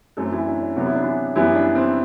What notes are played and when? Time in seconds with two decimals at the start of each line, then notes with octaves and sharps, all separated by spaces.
0.17 F#2 F#3 A3 C4 A4
0.32 E3 E4
0.47 D4
0.62 D4
0.76 C3 F#3 B3 F#4
0.85 E4
0.94 D4
1.03 E3 E4
1.36 F#2 E3 G3 B3 E4
1.55 D4
1.75 C4